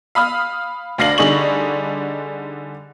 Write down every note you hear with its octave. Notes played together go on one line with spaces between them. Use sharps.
F5 B5 D#6 F6
D2 D4 F5 A#6 C7 F#7
D3 G3 D#4 G#4 C#6 F#7